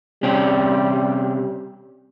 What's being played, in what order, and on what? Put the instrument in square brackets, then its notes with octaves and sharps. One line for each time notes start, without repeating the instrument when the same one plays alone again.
[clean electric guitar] C3 C#4 G4 [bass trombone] G3